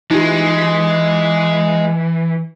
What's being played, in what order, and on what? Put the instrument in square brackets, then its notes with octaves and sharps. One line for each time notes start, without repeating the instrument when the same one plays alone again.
[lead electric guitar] E3 [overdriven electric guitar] G#3 [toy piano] D#4 F4 G4